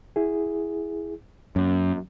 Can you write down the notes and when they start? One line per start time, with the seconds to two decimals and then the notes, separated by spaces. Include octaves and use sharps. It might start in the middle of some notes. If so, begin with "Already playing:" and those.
0.16 E4 G#4
1.56 F#2 A#3 C#4